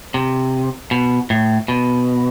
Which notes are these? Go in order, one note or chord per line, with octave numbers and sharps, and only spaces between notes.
C3
B2
A2
B2